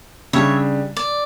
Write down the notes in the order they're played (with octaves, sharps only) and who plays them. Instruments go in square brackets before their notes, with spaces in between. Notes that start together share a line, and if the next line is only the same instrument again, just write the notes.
[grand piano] C#3 G3 D4 [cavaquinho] C#5 E5
[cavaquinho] D5